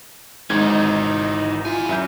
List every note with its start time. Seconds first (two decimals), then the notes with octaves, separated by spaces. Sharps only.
0.50 G#1 G#2 E3 D#4 G#6
1.65 B3 E4 F4 G#5
1.89 F#2 E5 G6